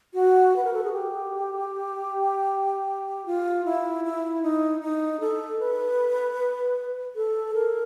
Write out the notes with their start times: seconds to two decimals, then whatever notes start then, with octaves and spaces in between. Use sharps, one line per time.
0.14 F#4
0.56 B4
0.64 A#4
0.74 A4
0.84 G#4
0.92 G4
3.26 F4
3.65 E4
4.04 E4
4.43 D#4
4.81 D#4
5.20 A4
5.59 B4
7.16 A4
7.55 A#4